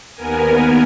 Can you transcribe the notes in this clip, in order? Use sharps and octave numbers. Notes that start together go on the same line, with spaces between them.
D#2 B3 A#4 G#5